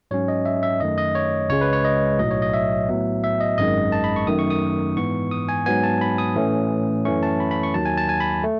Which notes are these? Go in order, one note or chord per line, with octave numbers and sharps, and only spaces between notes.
G#2 F#3 C#4 C#5
D#5
E5
E5
F#2 D#3 A3 D#5
D#5
C#5
C#2 C#3 G#3 C#5
B4
C#5
D#5
B1 A2 F#3 D#5
C#5
D#5
E5
A2 F#3 B3
E5
D#5
G#1 F#2 D#3 G#3 D#5
A5
B5
C#6
F#2 D#3 A3 D#6
C#6
D#6
G#2 E3 B3 C#6
D#6
G#5
G#2 F#3 B3 G#5
A5
B5
D#6
A2 E3 A3 C#4
F#2 E3 A3 C#4 C#6
A5
B5
B5
C#6
D#2 D#3 F#3 A5
G#5
A5
G#5
B5
A3